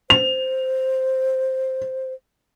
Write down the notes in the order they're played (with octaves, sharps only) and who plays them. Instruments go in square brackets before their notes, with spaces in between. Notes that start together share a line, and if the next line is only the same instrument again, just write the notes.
[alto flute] C5 [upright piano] F7